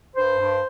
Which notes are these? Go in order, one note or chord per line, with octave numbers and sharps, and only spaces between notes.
G2 C5
G2